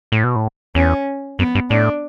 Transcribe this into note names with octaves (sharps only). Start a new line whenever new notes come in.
A2
B2
A2
E2 C#4
F#2 B3
G2
A2 D4